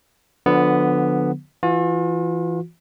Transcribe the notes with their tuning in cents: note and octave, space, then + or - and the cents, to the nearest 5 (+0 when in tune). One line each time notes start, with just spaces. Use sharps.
D3 +0 F3 +35 B3 +0
E3 +20 F4 +45